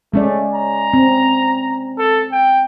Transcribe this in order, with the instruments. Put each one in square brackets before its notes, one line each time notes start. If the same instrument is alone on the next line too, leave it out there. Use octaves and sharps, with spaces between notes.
[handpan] G#3 C#4 D5 [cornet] A3
[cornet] A#5
[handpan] C4
[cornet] A4
G5